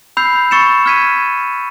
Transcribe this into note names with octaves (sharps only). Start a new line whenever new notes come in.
B5 E6 G6 C7 F7
C#6 E6 A6 C#7 E7
F6 G#6 B6 D#7